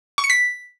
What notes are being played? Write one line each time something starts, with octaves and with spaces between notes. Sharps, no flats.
C#6
C#7
B6